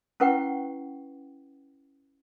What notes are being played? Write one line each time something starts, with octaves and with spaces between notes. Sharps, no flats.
C#4 E4 B4 F#5 G5 C#6